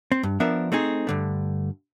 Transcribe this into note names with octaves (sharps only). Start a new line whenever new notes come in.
C4
G2
F3 B3 D4 A#4 E5
A3 C4 D#4 G#4
G2 D3 A3